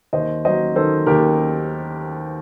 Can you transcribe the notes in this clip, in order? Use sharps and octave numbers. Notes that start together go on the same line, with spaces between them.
D#2 C5 D#5
F#3 C5 D#5
D#3 A4 C5
D#2 G4 A#4